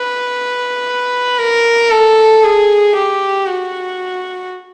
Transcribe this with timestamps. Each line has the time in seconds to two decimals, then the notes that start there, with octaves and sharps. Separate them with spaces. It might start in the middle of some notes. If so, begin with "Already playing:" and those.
Already playing: B4
1.38 A#4
1.90 A4
2.43 G#4
2.95 G4
3.48 F#4